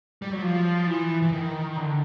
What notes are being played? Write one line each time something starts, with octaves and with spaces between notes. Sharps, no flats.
G3
F#3
F3
E3
E3
D#3
D3